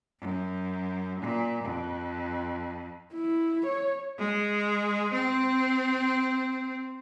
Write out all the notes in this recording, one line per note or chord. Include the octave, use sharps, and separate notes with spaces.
F#2
A#2
F2
E4
C#5
G#3
C4